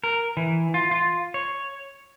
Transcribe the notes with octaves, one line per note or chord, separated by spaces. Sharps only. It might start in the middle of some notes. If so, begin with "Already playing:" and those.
A#4
E3
F4
F4
C#5